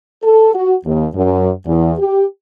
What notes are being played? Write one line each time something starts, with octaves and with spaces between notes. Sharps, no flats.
A4
F#4
D#2
F#2
E2
G4